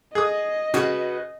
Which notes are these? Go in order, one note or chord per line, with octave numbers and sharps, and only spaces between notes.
G#4 D#5 D#6
C#3 F#4 B4 F#5